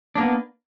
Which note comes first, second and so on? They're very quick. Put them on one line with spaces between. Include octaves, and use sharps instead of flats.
D4 A#3 B3